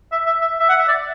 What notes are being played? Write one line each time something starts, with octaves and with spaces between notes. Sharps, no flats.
E5
E5
E5
E5
F#5
E5
D5